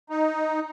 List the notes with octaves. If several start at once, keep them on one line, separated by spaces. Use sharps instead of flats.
D#4